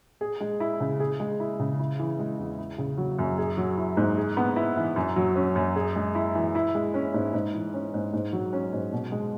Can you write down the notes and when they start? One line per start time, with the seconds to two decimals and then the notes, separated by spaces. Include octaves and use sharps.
0.21 G#4
0.40 G#3
0.60 E4
0.80 C#3
1.00 G#4
1.20 G#3
1.40 E4
1.59 C#3
1.79 E4
1.99 E3
2.19 G#3
2.39 E2
2.58 E4
2.78 C#3
2.98 F#3
3.19 F#2
3.38 G#4
3.57 F#3
3.77 E4
3.97 G#2
4.17 G#4
4.37 B3
4.56 E4
4.77 E3
4.96 F#2
5.16 F#3
5.36 C#4
5.56 F#2
5.76 G#4
5.96 G#3
6.15 E4
6.35 E3
6.55 E4
6.75 G#3
6.94 C#4
7.14 G#2
7.34 G#2
7.54 E3
7.74 C#4
7.94 G#2
8.13 G#2
8.33 F#3
8.53 C#4
8.73 G#2
8.92 B2
9.12 G#3